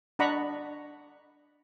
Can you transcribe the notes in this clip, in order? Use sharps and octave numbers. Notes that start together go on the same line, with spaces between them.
D4 D#5 F#5 A#5 B5 C#6